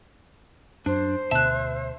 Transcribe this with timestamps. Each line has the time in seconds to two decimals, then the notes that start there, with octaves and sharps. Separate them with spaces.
0.86 F#2 D4 C5
1.31 D2 B2 E5 A5 F#6